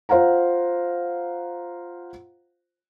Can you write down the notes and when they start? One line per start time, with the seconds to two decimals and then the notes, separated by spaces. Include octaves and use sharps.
0.09 F4 C5 F5 F#5 A#5